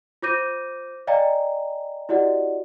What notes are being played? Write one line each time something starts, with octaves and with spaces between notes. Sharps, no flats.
F4 C5 D6 G6 A#6 D#7
D5 D#5 F5 G5 G#5 A#5
E4 F#4 G4 D5 D#5 F#5